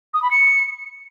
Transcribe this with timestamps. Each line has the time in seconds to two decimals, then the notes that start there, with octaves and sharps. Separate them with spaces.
0.14 D#6
0.22 B5
0.31 C#7